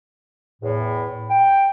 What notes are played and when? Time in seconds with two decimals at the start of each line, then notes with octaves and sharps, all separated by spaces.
0.62 E2 A2
1.30 G5